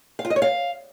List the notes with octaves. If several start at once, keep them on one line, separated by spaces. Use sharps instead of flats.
F5
F4
D#5
C#5
F5